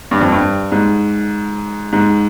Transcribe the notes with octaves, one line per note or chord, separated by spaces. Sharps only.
G2
F2
G2
G#2
G#2